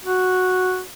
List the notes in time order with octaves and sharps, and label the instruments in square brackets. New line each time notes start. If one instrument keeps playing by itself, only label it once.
[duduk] F#4